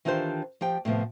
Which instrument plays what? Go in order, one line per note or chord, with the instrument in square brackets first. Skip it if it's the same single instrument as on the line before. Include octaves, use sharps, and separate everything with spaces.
[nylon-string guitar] D#3 E3 D4 F4 G4 C5
F3 G4 G5
A2 C3 F3 B3